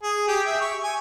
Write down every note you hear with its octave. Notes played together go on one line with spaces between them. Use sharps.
G#4
G4
E5
C#6
G#5